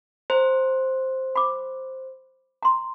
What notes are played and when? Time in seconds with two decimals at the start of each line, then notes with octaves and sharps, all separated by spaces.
0.30 C5 A#5
1.36 B5 D6
2.63 A#5 C6